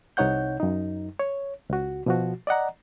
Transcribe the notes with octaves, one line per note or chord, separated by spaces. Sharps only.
C2 C3 D#4 C#5 F#5 G6
F#2 D#4
C#5
C#2 F#4
B2 F3 F#4
D5 D#5 F#5 A#5